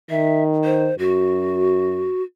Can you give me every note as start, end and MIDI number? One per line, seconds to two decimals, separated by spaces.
0.10 0.90 51
0.10 0.43 76
0.65 0.95 72
0.99 2.12 42
0.99 2.23 66